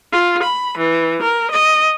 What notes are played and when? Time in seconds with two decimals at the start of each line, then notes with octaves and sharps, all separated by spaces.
0.11 F4
0.42 B5
0.78 E3
1.22 A#4
1.50 D#5